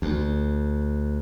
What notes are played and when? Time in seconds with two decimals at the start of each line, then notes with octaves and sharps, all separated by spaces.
0.02 D2